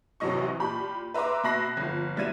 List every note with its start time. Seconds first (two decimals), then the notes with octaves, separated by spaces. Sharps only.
0.20 A1 C3 E3 F#3 D#5 C#6
0.59 A#2 G4 B5
1.14 B4 E5 A#5 C6 D6
1.44 B2 E5 B5 F#6 A#6 C7
1.77 G1 F3
2.16 B2 G3 E4 G#6 D#7 E7